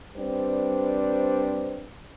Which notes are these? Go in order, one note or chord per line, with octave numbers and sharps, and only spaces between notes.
G3 C4 D4 B4 C5